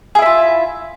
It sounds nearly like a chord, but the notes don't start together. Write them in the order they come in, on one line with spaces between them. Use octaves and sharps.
G#4 E4 E5 F4